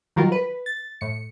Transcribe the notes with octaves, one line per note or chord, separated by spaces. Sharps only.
D#3 F#3 G3 F4 F#4 A#4
B4
A6
A2 C#7